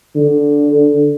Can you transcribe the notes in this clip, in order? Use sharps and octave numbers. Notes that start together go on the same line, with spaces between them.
D3